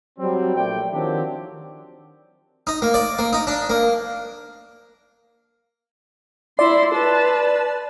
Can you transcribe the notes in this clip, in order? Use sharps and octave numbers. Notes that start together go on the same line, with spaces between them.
F#3 G3 C4
A#1 A3 D5 G5
D#3 F3 F#3 C4 D4 G4
D#4
A#3
D5
A#3
D#4
D4
A#3
E4 D5 C6
B4 A5